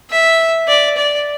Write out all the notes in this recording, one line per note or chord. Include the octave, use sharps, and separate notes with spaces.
E5
D5
D5